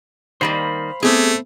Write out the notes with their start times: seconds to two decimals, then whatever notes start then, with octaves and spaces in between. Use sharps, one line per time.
0.41 D#3 G3 A#3 C5 F5 B5
1.03 A3 B3 C4 G4 G#4